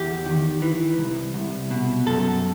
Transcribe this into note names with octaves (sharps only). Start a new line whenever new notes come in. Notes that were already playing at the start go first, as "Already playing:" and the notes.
Already playing: E2 G4
D#3
E3
C2
C2
B2
F#2 A4